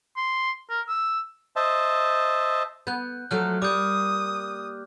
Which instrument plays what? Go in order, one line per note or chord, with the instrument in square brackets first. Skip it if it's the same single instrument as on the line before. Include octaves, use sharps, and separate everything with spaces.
[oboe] C6
A#4
E6
[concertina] C5 D#5 E5 A5
[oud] B3 [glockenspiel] F#6 G6
[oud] F3 F#3 A3 [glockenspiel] F6 F#6
[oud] G3 A#3 [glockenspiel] D6 G6 [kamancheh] D#6